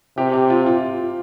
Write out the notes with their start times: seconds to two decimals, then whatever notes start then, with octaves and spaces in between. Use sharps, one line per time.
0.18 C3 G4
0.33 G4
0.50 F4
0.66 F4